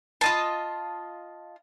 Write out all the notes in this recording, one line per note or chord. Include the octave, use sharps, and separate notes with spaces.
F4 D#5 A5